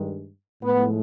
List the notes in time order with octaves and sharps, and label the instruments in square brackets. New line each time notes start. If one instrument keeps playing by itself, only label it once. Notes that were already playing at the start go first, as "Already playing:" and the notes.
Already playing: [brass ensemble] G2 D#3 G#3
A2 F3 G#3 B3